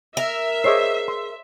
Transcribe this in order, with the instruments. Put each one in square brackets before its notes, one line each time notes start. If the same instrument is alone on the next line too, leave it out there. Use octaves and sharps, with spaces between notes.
[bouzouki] A#4 [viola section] E5
[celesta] G#4 E6 C7 [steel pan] C5 C#5 D#5
[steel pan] C6